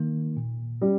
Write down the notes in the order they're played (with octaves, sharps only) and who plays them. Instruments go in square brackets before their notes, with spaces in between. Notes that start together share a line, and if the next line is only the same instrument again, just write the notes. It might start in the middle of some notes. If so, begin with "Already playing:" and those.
Already playing: [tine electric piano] D#3 A#3
A#2
[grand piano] G3 [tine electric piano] C#4